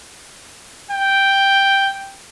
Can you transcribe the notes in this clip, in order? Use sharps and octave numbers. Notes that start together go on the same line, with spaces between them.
G5